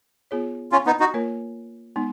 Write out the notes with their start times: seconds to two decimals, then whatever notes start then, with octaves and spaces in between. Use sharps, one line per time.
0.31 B3 F4 G#4 C#5
0.72 C#4 F4
0.86 B3 D#4
1.00 D#4 F#4
1.14 A#3 F4 A#4 C#5
1.96 G#3 B3 D#4